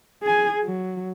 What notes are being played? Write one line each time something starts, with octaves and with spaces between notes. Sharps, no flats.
G#4 G#5
F#3